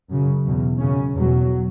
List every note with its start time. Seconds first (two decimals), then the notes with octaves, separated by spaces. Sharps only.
0.11 F#2 C#3
0.46 E2 B2
0.80 F#2 C#3 C#4
1.15 E2 B2 F#3